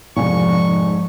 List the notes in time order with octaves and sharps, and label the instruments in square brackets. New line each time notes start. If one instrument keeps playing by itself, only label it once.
[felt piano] F1 G#5 [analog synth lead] G#2 [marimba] F3 [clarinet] C#6